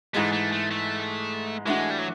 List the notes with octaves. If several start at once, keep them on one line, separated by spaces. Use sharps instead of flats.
G#2 E3 G#3 A3
A3
A3
A3
E3 G#3 A3 D4 F#4
G3
F#3